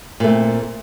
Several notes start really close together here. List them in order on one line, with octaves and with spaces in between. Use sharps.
A#2 A3 C4